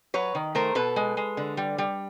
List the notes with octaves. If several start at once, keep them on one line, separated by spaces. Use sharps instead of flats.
F#3 B4 C#5
D#3
A3 A#4 C5
B2 A4 B4
G#3
G#3
D3
G3
G3